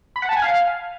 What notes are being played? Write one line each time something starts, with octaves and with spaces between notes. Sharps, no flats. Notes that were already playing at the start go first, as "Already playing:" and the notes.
B5
F#5
A5
G#5
F5